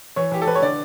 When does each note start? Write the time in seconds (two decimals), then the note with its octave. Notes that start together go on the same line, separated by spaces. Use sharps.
0.16 E3 C#5
0.32 E3 G4
0.41 A4
0.47 E3 B4
0.55 C#5
0.62 D3 D5